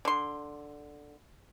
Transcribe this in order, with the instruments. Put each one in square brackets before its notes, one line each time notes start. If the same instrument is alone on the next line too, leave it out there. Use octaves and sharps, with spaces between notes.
[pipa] D3 C6